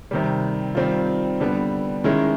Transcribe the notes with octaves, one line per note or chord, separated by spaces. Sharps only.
C3 D#3 G3
D#3 G3 C4 F4
D3 G3 B3
D#3 G#3 C#4 E4